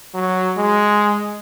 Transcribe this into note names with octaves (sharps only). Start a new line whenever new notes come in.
F#3
G#3